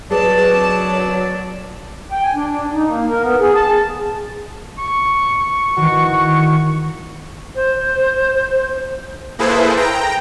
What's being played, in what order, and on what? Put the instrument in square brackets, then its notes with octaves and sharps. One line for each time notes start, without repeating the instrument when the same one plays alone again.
[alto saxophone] F#3 [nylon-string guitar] G#4 A4 B4 [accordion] D5 [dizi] A5
[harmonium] G5
G#5
D4
D4
D#4
A#3
A#4
B3
G#4
A5
[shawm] C#6
[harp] D#3 E3 [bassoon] F#4
[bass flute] C5
[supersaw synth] A#3 E4 G#4 A4 B4 C5
G5 A#5